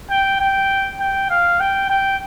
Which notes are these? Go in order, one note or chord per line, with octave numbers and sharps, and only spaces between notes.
G5
G5
G5
F5
G5
G5